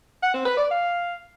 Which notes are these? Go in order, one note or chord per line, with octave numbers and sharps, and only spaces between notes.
F#5
C4
B4
D5
F5